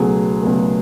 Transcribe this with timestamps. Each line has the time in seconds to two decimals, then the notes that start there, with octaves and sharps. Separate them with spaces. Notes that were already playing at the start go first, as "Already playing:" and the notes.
Already playing: C#2 B2 F#3 A3 G#4
0.42 C#2 B2 F#3 A3